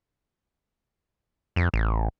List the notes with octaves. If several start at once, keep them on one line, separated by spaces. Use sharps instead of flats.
F2
A1